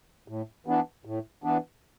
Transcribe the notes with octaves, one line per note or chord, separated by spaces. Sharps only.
A2
E3 B3 D4
A2
E3 B3 D4